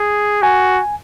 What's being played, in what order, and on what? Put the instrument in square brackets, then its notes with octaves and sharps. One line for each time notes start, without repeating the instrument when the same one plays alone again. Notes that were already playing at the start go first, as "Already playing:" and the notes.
Already playing: [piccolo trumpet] G#4
[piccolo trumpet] F#4 [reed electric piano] G#5